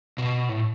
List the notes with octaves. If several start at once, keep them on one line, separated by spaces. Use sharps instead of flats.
B2
A2